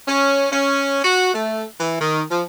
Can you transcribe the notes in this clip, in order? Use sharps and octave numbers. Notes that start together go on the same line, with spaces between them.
C#4
C#4
F#4
A3
E3
D#3
F3